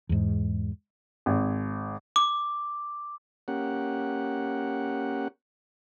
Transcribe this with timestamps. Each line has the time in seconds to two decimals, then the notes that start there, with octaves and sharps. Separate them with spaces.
0.09 E2 G#2
1.26 G#1
2.16 D6
3.48 A#3 C#4 G4 F#5